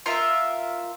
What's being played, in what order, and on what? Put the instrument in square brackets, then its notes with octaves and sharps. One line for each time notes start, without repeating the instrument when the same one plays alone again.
[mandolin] F4 A#4 E5